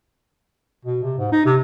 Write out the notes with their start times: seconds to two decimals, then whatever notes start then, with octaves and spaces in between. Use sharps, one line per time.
0.85 B2
1.03 C3
1.18 G#2
1.32 D#4
1.45 C3